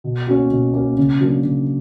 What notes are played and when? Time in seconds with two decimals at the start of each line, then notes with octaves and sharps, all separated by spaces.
0.04 B2
0.27 A#3 C#4 F#4
0.50 B2
0.74 A#3 C#4 F#4
0.97 C#3
1.21 F#3 A#3 D4
1.44 C#3